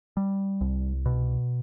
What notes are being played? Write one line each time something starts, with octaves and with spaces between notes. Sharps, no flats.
G3
C2
B2